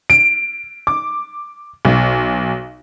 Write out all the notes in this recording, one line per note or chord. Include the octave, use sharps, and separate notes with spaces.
D7
D6
B1